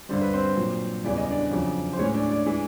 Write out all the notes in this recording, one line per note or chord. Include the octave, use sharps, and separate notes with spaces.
G2 D3 G3 C5
B4
C4 C5
A#2 F#3
E2 C#3 E3 G3 D5
D#5
D4 D5
F2 C#3 F#3
C5
A2 E3 G#3 C#4 C#5
D4 D5
D4 D5
E3 G#3